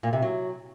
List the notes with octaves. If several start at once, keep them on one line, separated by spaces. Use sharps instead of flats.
A#2
C3
F#3